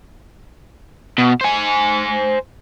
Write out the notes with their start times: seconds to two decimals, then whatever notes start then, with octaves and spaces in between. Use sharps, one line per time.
1.18 B2
1.41 C5 G#5